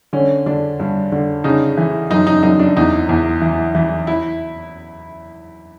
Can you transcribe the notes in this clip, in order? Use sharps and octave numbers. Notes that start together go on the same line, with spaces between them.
D3 C#4
D3 D4
G2
D3
C#3 D#4
E3
F#2 D#4
D#4
F#2 D#4
D4
E2 D#4
E2
E3
E3
E4